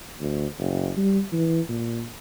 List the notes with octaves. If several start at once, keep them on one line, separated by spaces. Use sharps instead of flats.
D2
F#1
G3
E3
A#2